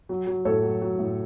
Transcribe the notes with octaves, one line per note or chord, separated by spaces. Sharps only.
F#3
F#3
A2 A4 C#5
F#3
F#3
A2